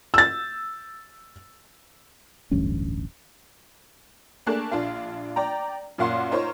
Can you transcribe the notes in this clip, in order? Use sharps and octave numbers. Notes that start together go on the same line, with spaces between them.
E6 A6
D1 A1 G2 C#4
A3 A#3 D4 G#4 A5 F#6
A#1 D4 F4 F5
D5 G5 A#5
F#2 A#2 A#3 F5 F#5 C6
D#4 F4 A#4 C5 C#5